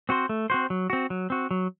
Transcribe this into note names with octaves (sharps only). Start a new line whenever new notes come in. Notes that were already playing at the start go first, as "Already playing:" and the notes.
C4 F#4 C5
A3
C4 F#4 C5
F#3
C4 F#4
F#3
C4 F#4
F#3